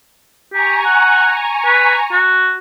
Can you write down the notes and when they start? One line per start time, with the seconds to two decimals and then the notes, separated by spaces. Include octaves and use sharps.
0.53 G4 G#5 A#5 C#6
0.85 F#5
1.65 B4
2.12 F#4